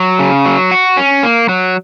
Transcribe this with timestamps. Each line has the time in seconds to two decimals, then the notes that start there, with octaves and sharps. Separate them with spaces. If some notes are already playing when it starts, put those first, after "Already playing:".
Already playing: F#3
0.19 C#3
0.46 F#3
0.71 F#4
0.97 C#4
1.23 A#3
1.49 F#3